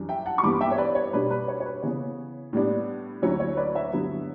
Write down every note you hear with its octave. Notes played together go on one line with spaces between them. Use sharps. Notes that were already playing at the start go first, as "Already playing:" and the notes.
Already playing: F#2 E3 G3 D4
E5 G5
F#5 A5
C#6
G2 E3 G3 B3 B5 D6
E5 G5
C#5
B4 D5
C#5
B2 G3 D4 B4
B4
C#5
C#5
B4
C#3 E3 B3 C#5
A2 G3 B3 D4
D2 D3 F#3 C#4 E4 C#5
C#5
B4 D5
C#5 E5
G2 D3 F#3 B3 E4